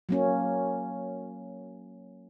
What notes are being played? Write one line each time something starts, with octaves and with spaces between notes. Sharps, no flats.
F#3 A#3 C#4